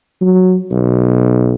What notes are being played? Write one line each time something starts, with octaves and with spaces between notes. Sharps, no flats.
F#3
B1